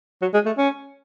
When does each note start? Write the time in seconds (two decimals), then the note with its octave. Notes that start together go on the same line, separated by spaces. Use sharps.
0.22 F#3
0.34 G#3
0.46 A3
0.58 C#4